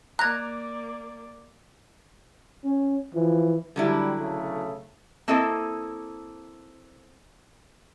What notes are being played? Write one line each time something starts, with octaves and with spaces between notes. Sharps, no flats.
A#3 D5 A#5 F#6 G#6
C#4
E3 F3
D3 F#3 G3 E4
B1 C#3 A3
A#3 C4 E4 A4 D#5